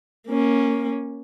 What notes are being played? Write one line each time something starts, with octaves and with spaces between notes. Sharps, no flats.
A#3 C#4